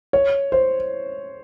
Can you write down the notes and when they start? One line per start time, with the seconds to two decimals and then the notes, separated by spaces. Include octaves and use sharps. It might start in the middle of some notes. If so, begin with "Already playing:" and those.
0.13 C#5
0.52 C5